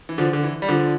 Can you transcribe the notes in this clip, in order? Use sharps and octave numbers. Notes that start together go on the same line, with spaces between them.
E3
D3 F3
D3
E3
G3
D3 F3